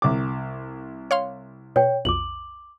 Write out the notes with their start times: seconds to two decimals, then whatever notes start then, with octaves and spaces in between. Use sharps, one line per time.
0.02 C2 D6
1.11 C#5 F5 C6
1.76 B2 C#5 G5
2.05 B1 F2 D6 F#7